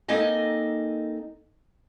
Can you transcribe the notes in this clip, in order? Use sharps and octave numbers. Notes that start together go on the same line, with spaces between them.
A#3 C4 D#4 A4 D#5 G#5